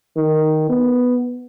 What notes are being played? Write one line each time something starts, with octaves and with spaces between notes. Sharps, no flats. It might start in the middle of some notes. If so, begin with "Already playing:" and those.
D#3
B3